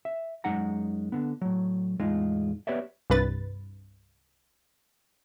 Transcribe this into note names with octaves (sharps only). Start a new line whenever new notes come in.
E5
F#2 G#3 D#4 F#5 A#5
D3 B3
A2 F#3
E2 A2 G#3 D#4 F4
B3 G4 B4 C#5 D5 E5
C2 G2 B4 A6